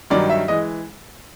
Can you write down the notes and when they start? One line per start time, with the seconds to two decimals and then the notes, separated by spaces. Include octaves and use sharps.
0.10 G2 D#3 F#3 D5
0.30 E5
0.48 E3 G#3 D#5